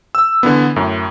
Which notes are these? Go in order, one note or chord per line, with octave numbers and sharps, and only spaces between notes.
E6
D3 E3 B3
F#2 A2